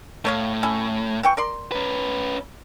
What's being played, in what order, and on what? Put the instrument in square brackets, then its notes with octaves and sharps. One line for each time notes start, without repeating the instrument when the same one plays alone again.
[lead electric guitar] A2 [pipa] A3 C#5 F5
[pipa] C#4 E4
E3 G5 C#6
A#4 D5 C6
[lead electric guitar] C#4 B4